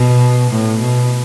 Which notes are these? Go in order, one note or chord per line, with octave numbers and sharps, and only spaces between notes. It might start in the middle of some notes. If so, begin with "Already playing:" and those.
Already playing: B2
A2
B2